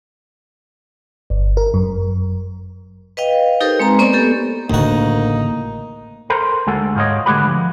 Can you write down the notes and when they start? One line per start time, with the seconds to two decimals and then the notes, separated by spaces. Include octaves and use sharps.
1.30 G1
1.57 A#4
1.74 F#2
3.17 B4 D#5 F5 G5
3.61 D#4 G4 A4 A#4 C5
3.80 G#3 C4 B4 A#5
3.99 A#3 B3 C5 D5 B5 C#6
4.13 B3 G4 A4
4.70 A1 D2 C#3 A#3 D#4 F#4
6.30 A4 A#4 C5 A#5
6.67 D2 G#3 F#4 A4
6.96 G#2 F4 A4 C#5 D#5
7.26 D3 G#3 A3 F#4 G4 B4
7.48 F3